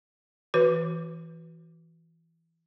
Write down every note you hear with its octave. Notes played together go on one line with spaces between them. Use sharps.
E3 F#4 B4